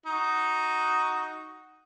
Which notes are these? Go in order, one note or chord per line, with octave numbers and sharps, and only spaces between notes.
D#4 F#4